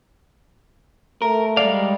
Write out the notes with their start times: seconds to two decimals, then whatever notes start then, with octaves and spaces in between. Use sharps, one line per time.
1.22 A3 A#4
1.57 G3 G#3 D5 F5